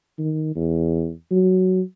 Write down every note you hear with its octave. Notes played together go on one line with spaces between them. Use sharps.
D#3
E2
F#3